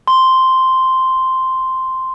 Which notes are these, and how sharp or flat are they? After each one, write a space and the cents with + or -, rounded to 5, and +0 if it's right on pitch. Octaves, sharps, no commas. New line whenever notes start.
C6 -5